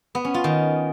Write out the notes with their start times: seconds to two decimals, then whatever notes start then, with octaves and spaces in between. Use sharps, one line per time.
0.15 B3
0.25 C#4
0.34 F4
0.44 D#3